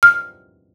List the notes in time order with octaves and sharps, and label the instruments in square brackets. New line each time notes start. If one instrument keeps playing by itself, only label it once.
[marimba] F6